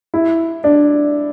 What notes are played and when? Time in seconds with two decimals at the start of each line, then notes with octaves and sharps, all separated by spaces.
0.14 E4
0.64 D4